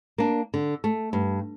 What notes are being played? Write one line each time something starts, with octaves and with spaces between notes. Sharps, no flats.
A#3 D4
D3
A3
G2